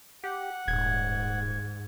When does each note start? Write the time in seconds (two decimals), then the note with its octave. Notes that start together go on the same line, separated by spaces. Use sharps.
0.24 G4 F#5
0.68 D#1 G#2 G#6